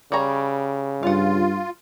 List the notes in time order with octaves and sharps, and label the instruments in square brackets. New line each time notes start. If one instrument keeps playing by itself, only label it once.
[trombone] C#3 [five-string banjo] G3 C#5 A#5
[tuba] G2 [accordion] F4 [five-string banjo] F5 F#5